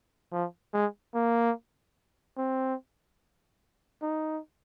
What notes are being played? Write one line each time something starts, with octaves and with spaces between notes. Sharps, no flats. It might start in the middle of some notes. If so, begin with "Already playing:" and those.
F3
G#3
A#3
C4
D#4